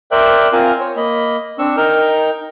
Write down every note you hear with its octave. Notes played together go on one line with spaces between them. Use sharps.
A#4 C5 D5 E5 G5 F#6
C4 F4 A#4 C5 F5 G#5
C5 C#5
A#3 D#5 B5
C4 D4 C#6 E6
D#4 A#4 G5 F6